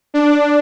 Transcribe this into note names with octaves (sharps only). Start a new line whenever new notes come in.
D4